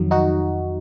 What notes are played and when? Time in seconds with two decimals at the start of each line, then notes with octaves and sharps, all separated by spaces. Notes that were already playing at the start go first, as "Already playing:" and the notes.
Already playing: F2 D#3 F#3
0.11 D#4 F#4